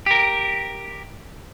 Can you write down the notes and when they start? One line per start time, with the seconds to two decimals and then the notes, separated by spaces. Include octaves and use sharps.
0.06 G4 A#4